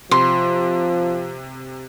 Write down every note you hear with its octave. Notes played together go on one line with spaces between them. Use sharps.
C3 F3 C6